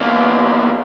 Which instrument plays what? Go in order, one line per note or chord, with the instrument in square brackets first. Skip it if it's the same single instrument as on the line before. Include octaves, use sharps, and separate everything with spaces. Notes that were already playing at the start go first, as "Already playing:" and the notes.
[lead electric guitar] E2 A#3